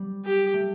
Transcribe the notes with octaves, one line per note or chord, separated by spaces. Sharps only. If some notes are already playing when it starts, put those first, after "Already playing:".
Already playing: G3
G4
A3